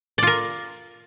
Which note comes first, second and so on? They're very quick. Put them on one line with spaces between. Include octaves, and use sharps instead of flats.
D5 F4 A#4